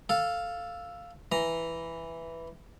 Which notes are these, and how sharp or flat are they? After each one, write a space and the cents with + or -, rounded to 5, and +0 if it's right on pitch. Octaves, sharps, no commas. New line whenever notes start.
A4 +0 F5 +0
E3 +0 A#5 +0